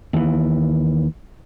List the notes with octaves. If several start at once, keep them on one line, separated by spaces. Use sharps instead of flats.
D#2 E3